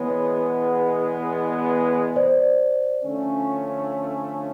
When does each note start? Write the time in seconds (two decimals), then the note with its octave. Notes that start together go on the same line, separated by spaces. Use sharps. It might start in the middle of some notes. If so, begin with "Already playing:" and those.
Already playing: E2 B2 G#3 B3 C#5
2.16 C5 D5
3.02 D3 F3 A3 C#4